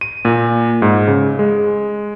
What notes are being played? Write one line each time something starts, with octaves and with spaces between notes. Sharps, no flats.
D#7
A#2
G#2
C#3
G#3